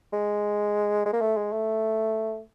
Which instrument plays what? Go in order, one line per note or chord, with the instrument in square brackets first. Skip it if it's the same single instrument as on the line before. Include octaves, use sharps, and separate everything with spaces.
[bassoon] G#3
G#3
A#3
A3
G#3
A3